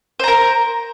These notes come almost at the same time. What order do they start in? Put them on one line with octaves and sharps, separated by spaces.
C5 A#5 A#4